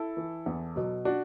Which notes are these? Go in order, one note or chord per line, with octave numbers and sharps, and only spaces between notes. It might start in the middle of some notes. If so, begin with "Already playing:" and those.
Already playing: E4 A4
E3
E2
B2 F#3
D4 F#4